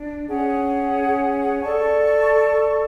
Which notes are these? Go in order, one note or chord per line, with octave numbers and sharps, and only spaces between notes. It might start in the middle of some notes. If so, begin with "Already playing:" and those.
Already playing: D4
C#4 G#4 C#5 F#5
A4 D5 A5 C#6